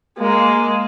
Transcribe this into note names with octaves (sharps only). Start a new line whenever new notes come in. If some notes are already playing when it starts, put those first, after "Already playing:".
G#3 A#3